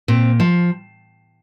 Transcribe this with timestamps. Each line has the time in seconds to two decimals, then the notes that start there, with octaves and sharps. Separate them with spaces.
0.08 A#2 C4
0.40 F3